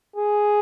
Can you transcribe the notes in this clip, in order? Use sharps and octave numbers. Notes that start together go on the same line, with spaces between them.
G#4